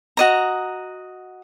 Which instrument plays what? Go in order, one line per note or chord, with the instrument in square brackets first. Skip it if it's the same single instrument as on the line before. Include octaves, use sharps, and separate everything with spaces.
[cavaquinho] F#4 D#5 A#5